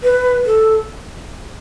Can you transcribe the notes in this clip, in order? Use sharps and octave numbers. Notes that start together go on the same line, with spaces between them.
B4
A4